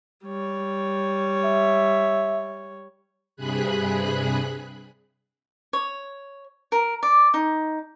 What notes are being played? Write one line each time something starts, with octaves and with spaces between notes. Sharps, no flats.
G3 C#5
E5
G2 C3 G#4 B5 F#6
C#5
A#4
D5
D#4